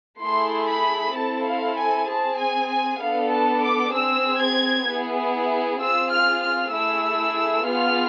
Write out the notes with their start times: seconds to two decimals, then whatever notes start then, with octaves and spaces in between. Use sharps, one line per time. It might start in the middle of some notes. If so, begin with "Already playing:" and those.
0.22 A3 E4 G#4 C6
0.68 B5
1.15 C4 E4 A4 A5
1.46 F5
1.77 G#5
2.08 C4 G#4 A5
2.39 G#5
2.70 G#5
3.01 B3 D4 A4 F5
3.32 A5
3.63 D6
3.94 C4 G#4 E6
4.41 G#6
4.87 B3 E4 G#4
5.80 C4 F4 G#4 E6
6.11 F6
6.42 F6
6.72 A3 E4 G#4 E6
7.65 B3 F4 G#4 F6